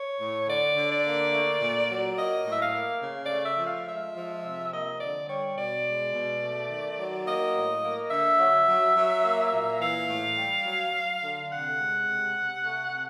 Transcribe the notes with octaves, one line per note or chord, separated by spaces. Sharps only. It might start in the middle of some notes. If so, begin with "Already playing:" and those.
Already playing: C#5
A2
D3 D5
D3
D5
A#3
A3
A#2
F#3
A#3 D#5
A2
E5
F5
A#3
C#3
D5
A3
E5
F3
F5
G#3 E5
F3
C3
A#3 D#5
D3 D5
G3 C#5
B2 D5
G#3
B2
A3
D#3
F#3
A#3 D#5
A2
A#3
D3 E5
F#3
F#3
F#3
A#3
A#2
E3 F5
A2
G3
F#3
F#3
D3
C3 F#5
G#3
C3
C3
A3
C3